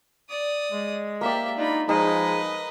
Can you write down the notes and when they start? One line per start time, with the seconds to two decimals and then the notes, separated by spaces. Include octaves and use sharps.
0.29 D5 D#6
0.72 G#3
1.21 A#3 G4 D5 E5
1.58 D4 D#4 F4 B5
1.89 F3 G#3 D#4 B4 D#5